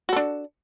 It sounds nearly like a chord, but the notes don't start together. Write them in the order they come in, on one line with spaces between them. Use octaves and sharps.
F#4 A4 D4